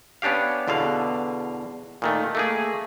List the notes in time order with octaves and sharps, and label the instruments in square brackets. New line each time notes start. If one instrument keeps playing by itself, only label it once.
[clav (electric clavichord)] B3 C#4 D4 G4 F5
E2 B2 D3 F5
A#2 D#3 A3
A3 A#3 G#4